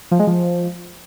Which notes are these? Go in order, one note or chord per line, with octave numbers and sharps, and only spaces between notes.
F3
G#3
F3